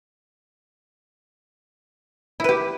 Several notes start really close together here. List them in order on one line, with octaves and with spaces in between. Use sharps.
E4 B4 G4